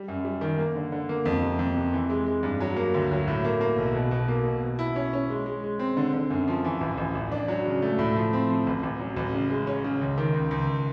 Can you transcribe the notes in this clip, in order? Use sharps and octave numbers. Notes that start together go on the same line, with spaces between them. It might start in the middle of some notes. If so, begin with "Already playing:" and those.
Already playing: G3
F#2
G3
D#3
A#3
D3
D3
A#3
F2
C3
F2
C3
E3
G#3
G#3
G2
F#3
A#3
D2
F#3
A2
A#3
A#3
B1
B2
B2
A#3
B2
B2
E4
C#4
C#4
G#3
G#3
G#3
C4
D3
D3
F#2
F3
E3
A1
A1
A1
D4
F#3
C#3
A3
A2
F3
C4
F3
A1
A1
F#3
A1
C#3
G#3
C#4
C#3
C#2
D#3
C#2
C#2